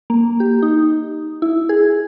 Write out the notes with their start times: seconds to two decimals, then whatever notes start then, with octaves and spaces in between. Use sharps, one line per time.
0.10 A#3
0.40 G4
0.63 D#4
1.42 E4
1.69 G#4